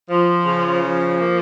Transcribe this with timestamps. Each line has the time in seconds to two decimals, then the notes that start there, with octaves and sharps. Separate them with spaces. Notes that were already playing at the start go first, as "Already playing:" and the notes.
0.09 F3
0.46 C#3
0.82 F3
1.19 A#3